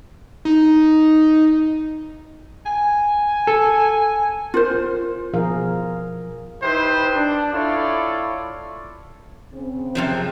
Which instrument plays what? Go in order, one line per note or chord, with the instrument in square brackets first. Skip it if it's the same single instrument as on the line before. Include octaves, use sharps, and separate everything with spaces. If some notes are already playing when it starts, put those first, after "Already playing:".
[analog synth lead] D#4
[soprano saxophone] G#5
[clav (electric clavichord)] A4
[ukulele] F4 A#4 C5
[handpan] B2 F3 G#4 A#4 F5
[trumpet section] D#4 E4 G4 B4 C5
D4
E4 F4 A4 C#5 D5
[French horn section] C#3 C4
[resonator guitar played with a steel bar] F#2 C3 F3